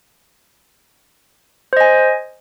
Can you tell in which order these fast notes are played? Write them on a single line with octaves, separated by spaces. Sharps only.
C5 D#5 G#5